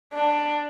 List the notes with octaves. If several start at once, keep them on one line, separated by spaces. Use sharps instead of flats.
D4